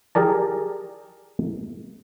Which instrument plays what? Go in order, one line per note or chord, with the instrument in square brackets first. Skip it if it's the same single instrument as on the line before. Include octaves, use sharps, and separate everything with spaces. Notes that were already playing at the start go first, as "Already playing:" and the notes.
[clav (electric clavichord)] G4 G#4 A#4 D5 A5